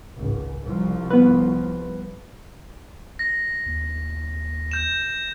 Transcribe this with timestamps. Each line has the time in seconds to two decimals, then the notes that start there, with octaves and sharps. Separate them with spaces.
0.16 G#1 C#2
0.64 C2 F3 G3
1.10 B3 B4
3.19 A#6
3.66 D#2
4.71 G6 E7